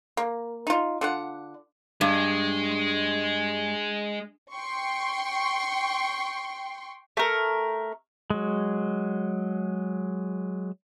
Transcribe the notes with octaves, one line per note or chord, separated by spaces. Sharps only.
A#3
D#4 F4
D3 F4 F#5
G2 G#3
G5 C6 C#6
A3 A#4
F#3 G#3